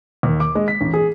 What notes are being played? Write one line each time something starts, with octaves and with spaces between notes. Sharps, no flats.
D#2
D6
G#3
B6
A1
G#4